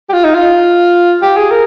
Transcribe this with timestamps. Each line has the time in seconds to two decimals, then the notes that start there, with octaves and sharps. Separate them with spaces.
0.09 G4
0.13 F4
0.24 D#4
0.35 F4
1.22 G4
1.37 G#4
1.51 A#4